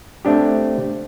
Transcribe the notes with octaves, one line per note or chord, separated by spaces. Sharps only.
A3 C4 D4 G4